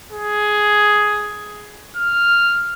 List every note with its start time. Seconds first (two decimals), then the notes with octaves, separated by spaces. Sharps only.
0.11 G#4
1.96 F6